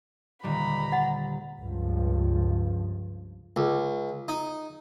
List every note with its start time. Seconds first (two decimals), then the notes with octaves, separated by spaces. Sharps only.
0.43 D#1 D3 G3 A#5 B5
0.92 F#5 A6
1.61 C#2 G2 F3
3.56 C#2
4.28 D#4